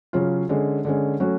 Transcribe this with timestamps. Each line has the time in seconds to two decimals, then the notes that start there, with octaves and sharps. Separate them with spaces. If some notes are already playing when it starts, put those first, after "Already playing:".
0.13 C#3 F#3 C#4 F4
0.49 D3 G#3 C#4
0.85 D3 G#3 C#4
1.20 F#3 A3 C#4 F#4